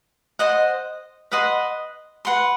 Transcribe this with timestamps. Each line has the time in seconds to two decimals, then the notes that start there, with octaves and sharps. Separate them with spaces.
0.39 C5 D#5 F#5
1.31 B4 D#5 F#5 C6
2.25 B4 F#5 C6